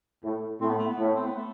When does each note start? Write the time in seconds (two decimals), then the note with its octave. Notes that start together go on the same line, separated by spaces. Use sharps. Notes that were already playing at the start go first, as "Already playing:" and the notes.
0.23 A2
0.61 A2 C4
0.69 B3
0.78 A3
0.87 B3
0.98 A2
1.15 C4
1.26 B3
1.36 A3